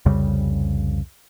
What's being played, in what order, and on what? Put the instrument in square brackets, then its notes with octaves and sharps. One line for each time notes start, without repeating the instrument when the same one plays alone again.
[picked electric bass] C2 F2 C#3 G3